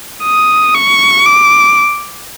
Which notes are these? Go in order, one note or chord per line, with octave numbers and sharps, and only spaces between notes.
D#6
C#6
D6